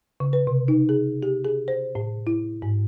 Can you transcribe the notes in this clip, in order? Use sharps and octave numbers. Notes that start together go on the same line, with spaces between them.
C#3
B4
C3
D#4
G#4
G4
G#4
C5
A2
E4
G#2